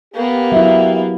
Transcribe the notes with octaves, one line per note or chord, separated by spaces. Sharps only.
A#3 B3 G4
F#3 E4 E5